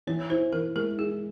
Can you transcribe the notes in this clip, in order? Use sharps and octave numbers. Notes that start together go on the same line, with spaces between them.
E3 C#5
E4 C5
E3 A#4
G#3 A#4
E4 G#4